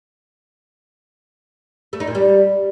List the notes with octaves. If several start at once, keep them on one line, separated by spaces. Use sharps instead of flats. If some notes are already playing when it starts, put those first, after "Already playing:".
A3
D#4
A#2
G3